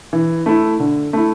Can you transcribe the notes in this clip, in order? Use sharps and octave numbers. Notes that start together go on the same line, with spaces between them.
E3
A3 E4
D3
A3 E4